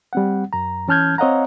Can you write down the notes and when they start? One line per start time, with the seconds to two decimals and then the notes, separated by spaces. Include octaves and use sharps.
0.13 G3 C4 F#5
0.53 F#2 A#5
0.88 E3 C#4 A5 F6 G6 G#6
1.18 C4 C#5 D#5 F5 F#5 A#5